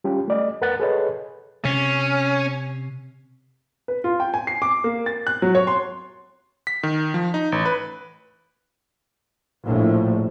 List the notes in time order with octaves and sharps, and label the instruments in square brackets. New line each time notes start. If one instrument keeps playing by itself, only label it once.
[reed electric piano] G3 C#4 F4 G4
A3 D5 D#5
F2 A#4 B4 F#5 F#6 A6
G#4 A4 B4 C#5 D#5
[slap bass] C3 [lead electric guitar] C#4
[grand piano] B4
F4
G5
G#5
C7
D6
A#3
A6
F#6
F#3
C#5
C6
[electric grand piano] B6
D#3
F3
D#4
A1
B4
[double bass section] A#1 A2